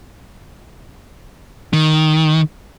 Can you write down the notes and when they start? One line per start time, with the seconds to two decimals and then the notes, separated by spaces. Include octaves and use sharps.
1.73 D#3